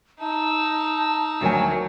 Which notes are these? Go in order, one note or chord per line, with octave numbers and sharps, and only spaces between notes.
D#4 A5 E6
D2 D#3 F#3 G#5